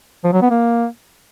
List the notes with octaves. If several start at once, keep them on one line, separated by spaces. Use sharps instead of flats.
F3
F#3
B3
A#3